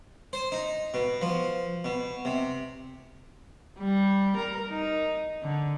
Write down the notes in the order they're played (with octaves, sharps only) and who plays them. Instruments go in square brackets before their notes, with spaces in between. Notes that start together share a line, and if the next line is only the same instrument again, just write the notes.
[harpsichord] C5
D#4
B2
F3
B2
C3
[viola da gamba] G3
A#4
D#4
D3